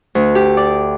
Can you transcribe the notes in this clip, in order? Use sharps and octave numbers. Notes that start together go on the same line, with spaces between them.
D2
G4
D5